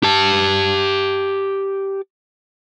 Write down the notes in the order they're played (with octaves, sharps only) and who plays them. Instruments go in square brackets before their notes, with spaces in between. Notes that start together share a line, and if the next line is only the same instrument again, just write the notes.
[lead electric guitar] G4 A5